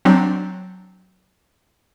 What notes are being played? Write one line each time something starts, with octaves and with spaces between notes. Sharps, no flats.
F#3 C4 D4